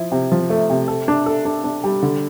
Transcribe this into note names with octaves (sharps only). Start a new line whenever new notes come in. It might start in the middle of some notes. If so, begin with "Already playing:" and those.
Already playing: F3 E4
C3
F3
A3
C3
A4
D4
A4
D4
D4
G3
D3